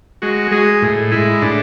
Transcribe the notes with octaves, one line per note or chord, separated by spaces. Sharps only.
G#3 F#4
G#3 G#4
A2
G#3 E4
A2 D4